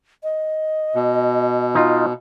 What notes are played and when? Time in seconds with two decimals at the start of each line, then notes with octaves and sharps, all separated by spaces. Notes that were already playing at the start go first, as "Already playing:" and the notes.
0.23 D#5
0.95 B2
1.75 D#4 F4